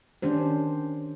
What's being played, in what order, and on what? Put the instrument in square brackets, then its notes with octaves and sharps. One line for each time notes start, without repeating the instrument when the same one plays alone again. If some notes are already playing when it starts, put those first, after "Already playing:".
[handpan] D#3 C#4 D4 G4 C5